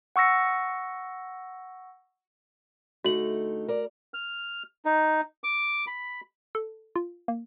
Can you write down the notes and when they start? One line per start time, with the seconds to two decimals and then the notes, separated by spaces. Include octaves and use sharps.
0.16 F#5 C#6 E6 A#6 C#7
3.04 D3 A3 D#4 F#4 F#7
3.68 A#4 D5
4.14 F6
4.85 D#4
5.44 D6
5.87 B5
6.55 A4
6.96 F4
7.28 A#3